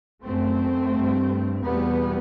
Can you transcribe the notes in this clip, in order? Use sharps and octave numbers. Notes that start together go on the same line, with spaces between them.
F#2 A3 C4
G2
E2 B2 G3 B3